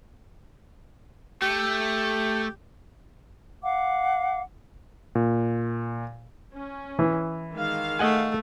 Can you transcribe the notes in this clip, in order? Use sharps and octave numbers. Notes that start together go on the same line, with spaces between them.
A3 G4
F5 F#5 D6
A#2
C#4
E3
D#3 G#3 F5
A3 D#5 F#5 G#5